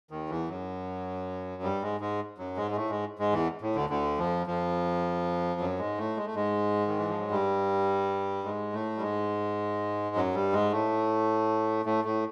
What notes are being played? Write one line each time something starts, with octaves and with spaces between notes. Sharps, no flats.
D#2 D#3
E2 E3
F#2 F#3
G2 G3
G#2 G#3
G#2 G#3
F#2 F#3
G#2 G#3
G#3
A2 A3
G#2 G#3
G#2 G#3
E2 E3
A2
D2 D3
D2 D3
F2 F3
F2 F3
F#2 F#3
G#2 G#3
A2 A3
G#3
A3
G#2 G#3
D#3
E3
F3
F#3
G2 G3
G#2 G#3
A2 A3
G3
G#2 G#3
F#2 F#3
G2 G3
G#2 G#3
A2 A3
A2 A3
A2 A3